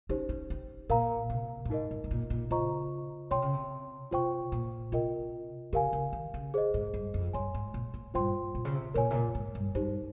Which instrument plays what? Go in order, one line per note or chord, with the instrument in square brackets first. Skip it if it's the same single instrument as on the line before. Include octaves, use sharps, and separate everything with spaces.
[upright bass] C#4 [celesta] D#4 G4 C5
[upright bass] C#4
C4
[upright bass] A#2 [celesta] A#4 F5 A#5
[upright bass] C3
A#2
[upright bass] G#2 [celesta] D#4 A#4 D#5
[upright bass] G#2
C3
A#2
A#2
[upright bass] C#3 [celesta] F4 C5 D#5 A#5 C#6
[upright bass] C3 [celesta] C#5 G5 C6
[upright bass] C#3
C3
[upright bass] C3 [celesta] F4 C5 G5 C#6
[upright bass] A#2
[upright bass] C3 [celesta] F4 A#4 D#5 G5
[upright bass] C#3 [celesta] G4 A#4 F5 G#5
[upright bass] C#3
D#3
C#3
[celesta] G#4 C5 D#5
[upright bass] G#2
G2
F2
[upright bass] G2 [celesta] C#5 G#5 C6
[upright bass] G#2
A#2
A#2
[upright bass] G2 [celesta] F4 C5 G5 C6
[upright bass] A#2
C#3
C3
[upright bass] A#2 [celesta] A#4 C#5 G#5
[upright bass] C3
A#2
G#2
G2
[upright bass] G2 [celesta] D#4 G4 C5